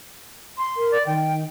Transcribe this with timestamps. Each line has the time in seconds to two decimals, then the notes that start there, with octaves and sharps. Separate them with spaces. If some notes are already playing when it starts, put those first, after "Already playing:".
0.58 C6
0.76 A#4
0.91 D5
1.06 D#3 G5